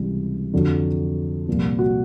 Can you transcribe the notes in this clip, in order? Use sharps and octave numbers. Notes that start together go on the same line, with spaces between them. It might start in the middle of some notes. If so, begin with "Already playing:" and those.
Already playing: C#2 C3 E3 G3
F2 D3 F#3
C2 A#2 F3
F#4